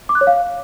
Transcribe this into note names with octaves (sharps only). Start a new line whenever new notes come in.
D6
F#6
C#5
F5